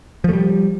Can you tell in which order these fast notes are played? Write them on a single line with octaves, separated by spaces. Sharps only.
F3 A3 G3